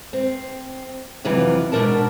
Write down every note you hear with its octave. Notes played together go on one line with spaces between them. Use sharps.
C4
F2 C3 E3 F#3 B3 F4
G#2 B2 B3 D4 A#4 A5